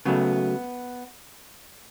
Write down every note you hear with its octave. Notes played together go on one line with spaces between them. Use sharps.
C#3 F#3 A3 B3